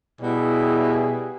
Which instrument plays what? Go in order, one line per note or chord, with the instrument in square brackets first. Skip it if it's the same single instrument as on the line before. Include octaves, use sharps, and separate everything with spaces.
[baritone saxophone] B2 [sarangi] G3 [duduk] E4 [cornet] G#4